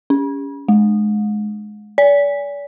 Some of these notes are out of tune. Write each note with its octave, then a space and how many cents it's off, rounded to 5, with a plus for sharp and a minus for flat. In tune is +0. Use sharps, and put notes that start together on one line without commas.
C#4 +25
G#3 +20
D5 -40